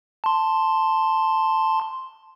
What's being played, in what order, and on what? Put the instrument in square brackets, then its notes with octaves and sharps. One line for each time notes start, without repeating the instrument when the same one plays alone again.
[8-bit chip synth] A5 C6